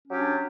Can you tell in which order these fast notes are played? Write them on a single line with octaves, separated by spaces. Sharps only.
C#4 F#3 G4 D4